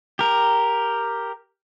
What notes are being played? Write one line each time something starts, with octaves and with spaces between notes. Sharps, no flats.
G4 A#4